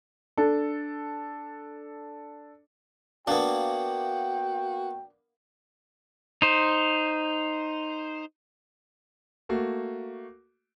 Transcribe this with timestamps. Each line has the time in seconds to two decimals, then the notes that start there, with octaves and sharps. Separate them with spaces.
0.37 D4 A4
3.27 A#3 B3 D4 F#4 G5
6.42 D#4 C5
9.49 A3 A#3 F#4